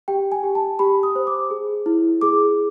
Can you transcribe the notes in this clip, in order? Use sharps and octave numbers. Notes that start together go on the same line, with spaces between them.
G4 G5
G#5
G4
A5
G4 B5
D#6
C5
D6
G#4
E4
G#4 D6